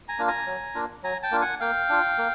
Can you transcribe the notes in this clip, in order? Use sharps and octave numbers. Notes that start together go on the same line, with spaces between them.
G#5 A#5
A#3 D4 F4
G#5 A#5
F#3
A#3 D4 F4
F#3 G#5 A#5
G5 A5
A#3 D4 F4
F#5 G#5
A#3 F5 G5
D4 F4
A#3